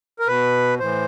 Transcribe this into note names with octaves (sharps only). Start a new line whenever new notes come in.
A#4
B2 B4
A2 E3 C5